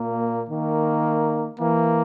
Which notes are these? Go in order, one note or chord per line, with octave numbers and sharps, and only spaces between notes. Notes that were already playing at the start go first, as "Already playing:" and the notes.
Already playing: A#2 A#3
D#3 A#3
E3 A#3